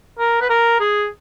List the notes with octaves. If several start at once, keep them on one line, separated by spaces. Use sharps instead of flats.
A#4
B4
A#4
G#4